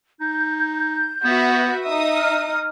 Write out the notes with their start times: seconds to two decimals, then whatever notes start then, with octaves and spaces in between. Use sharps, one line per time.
0.21 D#4 G6
1.25 B3 F#4 B4 E5
1.85 D#4 E5 D#6
2.16 F6